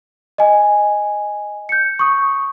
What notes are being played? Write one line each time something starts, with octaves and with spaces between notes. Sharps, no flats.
D#5 G#5
G6 C#7
C#6 D#6